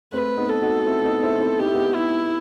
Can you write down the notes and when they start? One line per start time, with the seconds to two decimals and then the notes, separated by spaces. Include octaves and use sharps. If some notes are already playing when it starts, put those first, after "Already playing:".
0.12 A3 C4 B4
0.37 B3 D#4
0.49 A4
0.62 D#4 F#4
0.79 F#4
0.86 C4 E4
1.04 B3 D#4
1.23 C4 E4
1.41 C4 E4
1.59 D#4 G4
1.66 E4
1.74 B3 D#4
1.95 E4